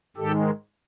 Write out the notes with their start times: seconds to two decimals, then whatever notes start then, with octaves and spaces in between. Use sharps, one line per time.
0.17 G#2 D#3 G#3 G4 A4